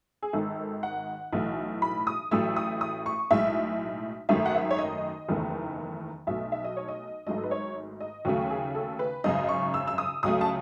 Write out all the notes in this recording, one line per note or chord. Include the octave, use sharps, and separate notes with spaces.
G#4
G#1 G#2 D#3 A4
F#5
B1 A2 E3 A3
B5
D#6
A1 A2 F#3 A3 E6
D#6
D#6
C#6
B1 A2 G#3 E5
G#1 F#2 D#3 A3 E5
F#5
E5
C#5
D#5
F#1 E2 D#3 A3
B1 B2 A3 E5
E5
D#5
C#5
D#5
G#1 G#2 F#3 A3 D#5
A4
B4
C#5
D#5
D#2 C#3 F#3 A3 F#4
G#4
A4
B4
G#1 F#2 C#3 D#5
C#6
E6
E6
D#6
C#2 C#3 F#3 A3 D#6
A5